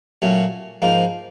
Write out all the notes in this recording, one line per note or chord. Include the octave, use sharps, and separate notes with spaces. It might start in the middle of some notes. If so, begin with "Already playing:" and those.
A#2 F#3 A3 C#4
G#2 F3 A#3 D#4